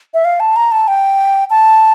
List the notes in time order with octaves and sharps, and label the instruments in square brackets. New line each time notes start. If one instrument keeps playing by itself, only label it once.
[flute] E5
F5
A5
A#5
A5
G5
A5